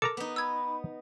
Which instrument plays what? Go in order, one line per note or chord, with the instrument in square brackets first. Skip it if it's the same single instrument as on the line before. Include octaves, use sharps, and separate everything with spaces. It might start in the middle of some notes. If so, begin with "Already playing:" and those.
[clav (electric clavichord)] A4 A#4 A#5 [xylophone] D6
[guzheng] B3 D#4
[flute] B5 [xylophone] E6 G#6